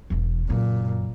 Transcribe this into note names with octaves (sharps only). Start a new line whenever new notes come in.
E1 E3
F#2 A#2 C#3